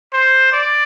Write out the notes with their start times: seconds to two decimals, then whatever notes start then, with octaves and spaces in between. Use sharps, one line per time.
0.13 C5
0.53 D5